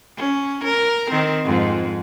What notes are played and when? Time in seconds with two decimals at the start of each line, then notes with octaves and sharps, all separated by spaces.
0.17 C#4
0.64 A#4
1.10 D#3 C4
1.45 F2 G#2